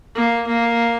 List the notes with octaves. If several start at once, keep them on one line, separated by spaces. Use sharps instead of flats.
A#3
A#3